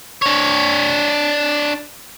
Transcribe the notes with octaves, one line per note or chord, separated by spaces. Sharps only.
D4 C#5